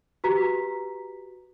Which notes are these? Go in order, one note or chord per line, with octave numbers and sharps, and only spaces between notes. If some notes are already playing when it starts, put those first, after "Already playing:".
F#4 G4 B4 A#5 B6